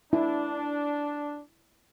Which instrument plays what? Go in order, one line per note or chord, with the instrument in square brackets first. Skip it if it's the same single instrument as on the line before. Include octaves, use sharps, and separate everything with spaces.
[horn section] D4 [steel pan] E4